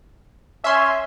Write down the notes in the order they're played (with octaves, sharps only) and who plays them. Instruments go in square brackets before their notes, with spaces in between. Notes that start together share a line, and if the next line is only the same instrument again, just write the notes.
[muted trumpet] C#4 [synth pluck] E5 C6